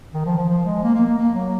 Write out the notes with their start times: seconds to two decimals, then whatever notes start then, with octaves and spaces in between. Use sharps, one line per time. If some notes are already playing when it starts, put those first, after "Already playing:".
0.14 D#3
0.26 F3
0.37 F3
0.49 F3
0.66 G#3
0.83 A#3
0.94 A#3
1.06 A#3
1.18 A#3
1.35 F#3